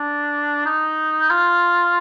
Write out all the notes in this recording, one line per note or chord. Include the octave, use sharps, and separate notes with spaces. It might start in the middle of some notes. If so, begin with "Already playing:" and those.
Already playing: D4
D#4
F4